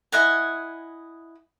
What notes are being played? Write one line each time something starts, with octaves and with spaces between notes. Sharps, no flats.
E4 D#5 F#5 G#5